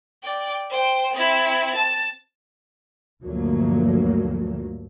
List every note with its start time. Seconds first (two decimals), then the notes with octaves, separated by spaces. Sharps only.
0.23 D5 G5
0.70 C5 G5
1.13 C4 E4
1.75 A5
3.23 D2 G2 A#2 F3 F#3 A#3